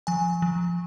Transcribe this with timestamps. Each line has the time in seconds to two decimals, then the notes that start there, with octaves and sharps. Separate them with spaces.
0.07 F3 G#5
0.42 F3